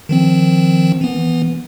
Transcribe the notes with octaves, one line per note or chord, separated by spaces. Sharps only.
D#3 F3 C4
E3 B3